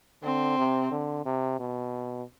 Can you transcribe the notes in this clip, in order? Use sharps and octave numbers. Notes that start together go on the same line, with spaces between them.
D3 C4
C3
D3
C3
B2